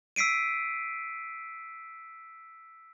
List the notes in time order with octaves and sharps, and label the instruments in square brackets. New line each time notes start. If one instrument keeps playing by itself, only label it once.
[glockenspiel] E6 B6 C7 D7 D#7